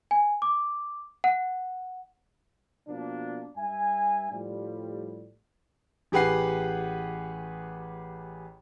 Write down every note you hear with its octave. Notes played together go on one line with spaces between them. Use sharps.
G#5
D6
F#5
B2 F3 A#3 D4
G2 E5 G#5
A2 F3 G3
A1 G4 G#4 B4 F#5 C7